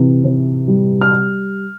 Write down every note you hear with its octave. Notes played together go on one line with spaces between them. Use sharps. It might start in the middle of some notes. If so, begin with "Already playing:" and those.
Already playing: C3 E3
C3
G3
F6